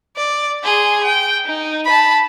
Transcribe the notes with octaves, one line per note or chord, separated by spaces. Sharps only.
D5
G#4 C6
G5
D#4
A5 B5